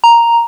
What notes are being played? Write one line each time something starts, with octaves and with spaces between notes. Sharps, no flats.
A#5